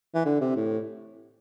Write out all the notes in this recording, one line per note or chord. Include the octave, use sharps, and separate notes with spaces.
E3
D3
C3
A2